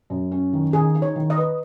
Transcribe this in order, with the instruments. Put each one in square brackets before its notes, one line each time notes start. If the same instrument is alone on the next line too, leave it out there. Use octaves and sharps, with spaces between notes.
[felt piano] F#2
C#4
D#3
[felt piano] D#3 [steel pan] G#4
[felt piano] D#4
[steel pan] C#5
[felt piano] D#3
[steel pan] D#5
[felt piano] B4